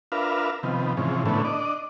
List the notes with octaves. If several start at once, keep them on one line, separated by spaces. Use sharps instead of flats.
D4 F4 A#4 B4 E5 F5
C3 D#3 F3 B3
G#2 C3 E3 F3 C#4
A2 D3 A3 B3 C#4 E4
D4 D5 D#5